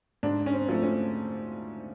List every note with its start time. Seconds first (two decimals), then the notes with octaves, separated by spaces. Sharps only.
0.23 G#2 D4
0.46 C#4
0.53 C4
0.69 F3 A3
0.83 C#4